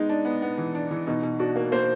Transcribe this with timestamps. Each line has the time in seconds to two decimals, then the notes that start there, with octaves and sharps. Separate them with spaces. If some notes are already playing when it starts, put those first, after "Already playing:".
Already playing: G#3 B3 D#4
0.09 D4
0.25 B3
0.42 B3
0.57 E3
0.75 D4
0.91 E3
1.07 B2 D#4
1.23 B2
1.39 D4 F#4
1.56 A#3
1.72 A#3 C5